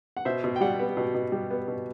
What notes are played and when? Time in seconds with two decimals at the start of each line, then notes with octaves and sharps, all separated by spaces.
0.17 F#5
0.25 B2 C5 E5
0.44 B2
0.56 G5
0.61 G3 D5 F#5
0.79 B3
0.97 B2
1.14 B2
1.32 G3
1.51 B3
1.68 B2